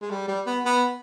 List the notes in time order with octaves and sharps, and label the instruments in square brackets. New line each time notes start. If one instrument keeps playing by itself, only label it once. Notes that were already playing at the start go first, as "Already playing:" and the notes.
[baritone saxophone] G#3
G3
G3
B3
B3